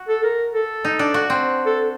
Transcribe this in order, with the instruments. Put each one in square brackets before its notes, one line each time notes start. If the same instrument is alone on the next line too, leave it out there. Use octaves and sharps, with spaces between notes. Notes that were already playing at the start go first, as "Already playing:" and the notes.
Already playing: [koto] F#4
[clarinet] A4
A#4
A4
[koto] D#4
D4
F#4
C4
[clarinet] A4